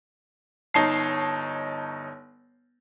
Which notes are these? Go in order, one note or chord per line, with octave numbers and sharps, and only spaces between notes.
G1 D#4 C#5 A5 C7